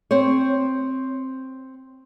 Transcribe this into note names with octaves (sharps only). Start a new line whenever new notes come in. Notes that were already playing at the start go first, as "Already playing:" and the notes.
C4 C5 C#5